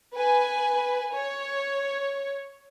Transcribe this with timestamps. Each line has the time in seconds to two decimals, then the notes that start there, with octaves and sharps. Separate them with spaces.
0.15 B4 G#5
1.14 C#5